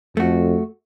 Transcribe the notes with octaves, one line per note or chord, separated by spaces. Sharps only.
F2 A3 F#4